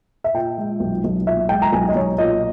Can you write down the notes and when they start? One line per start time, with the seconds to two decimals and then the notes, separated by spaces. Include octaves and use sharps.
0.24 E5
0.34 A#2 G5
0.58 G#3
0.80 B1
1.04 B1
1.26 A#2 E5
1.49 G#3 G5
1.62 A#5
1.73 B1 G#5
1.89 D#5
1.95 B1 C#5
2.18 A#2 D#5